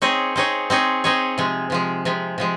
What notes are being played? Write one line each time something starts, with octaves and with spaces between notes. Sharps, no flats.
C4 D#4 G#4 C#5
C4 D#4 G#4 C#5
C4 D#4 G#4 C#5
C4 D#4 G#4 C#5
C3 F3 G#3
C3 F3 G#3
C3 F3 G#3
C3 F3 G#3